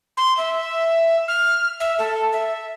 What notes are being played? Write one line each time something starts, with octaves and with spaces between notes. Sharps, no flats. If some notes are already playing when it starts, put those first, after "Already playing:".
C6
E5
F6
E5
A4
E5